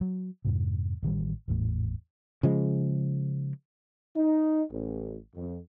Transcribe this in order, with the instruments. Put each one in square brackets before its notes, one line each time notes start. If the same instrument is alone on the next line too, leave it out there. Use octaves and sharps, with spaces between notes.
[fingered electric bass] F#3
F2 G#2 C3
A1 D#3 F3 G3
G#1 E2 A2
[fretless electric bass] C#3 F3 G#3
[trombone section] D#4
A1
F2